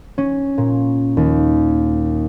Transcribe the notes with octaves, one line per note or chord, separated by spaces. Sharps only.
C#4
A#2
D#2